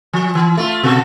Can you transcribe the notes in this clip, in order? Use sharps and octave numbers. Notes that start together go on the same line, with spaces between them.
F3
E3
A3 F4
B2 F#4 A4